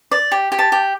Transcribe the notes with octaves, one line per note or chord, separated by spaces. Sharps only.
D5
G4
G4
A5
G4